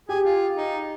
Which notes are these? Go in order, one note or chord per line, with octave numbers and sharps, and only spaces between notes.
G4 G#4
F4
D#4